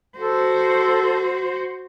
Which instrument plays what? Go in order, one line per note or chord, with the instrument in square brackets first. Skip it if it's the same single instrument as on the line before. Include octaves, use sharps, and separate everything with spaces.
[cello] F#4 C5 [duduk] A4